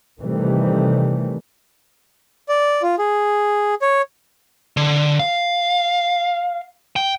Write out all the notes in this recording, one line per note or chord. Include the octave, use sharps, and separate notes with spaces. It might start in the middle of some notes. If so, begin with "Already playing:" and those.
C3 D#3 E3 G3 A3
D5
F4
G#4
C#5
D3
F5
G5